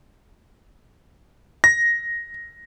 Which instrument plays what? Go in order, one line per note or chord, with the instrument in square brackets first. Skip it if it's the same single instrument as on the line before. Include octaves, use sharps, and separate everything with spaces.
[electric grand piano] A#6